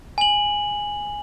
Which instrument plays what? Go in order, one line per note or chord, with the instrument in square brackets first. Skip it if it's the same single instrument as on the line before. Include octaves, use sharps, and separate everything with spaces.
[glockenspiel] G#5 F#7